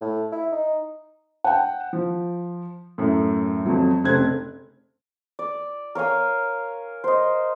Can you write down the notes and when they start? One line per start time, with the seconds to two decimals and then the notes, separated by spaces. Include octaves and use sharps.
0.01 A2
0.32 E4
0.52 D#4
1.44 F#5 G5
1.93 F3
2.98 F#2 A2
3.65 F2 F#3
4.04 F1 C#3 C4 F#6 G#6
5.39 D5
5.95 A#4 C#5 F5 G#5
7.04 C5 D#5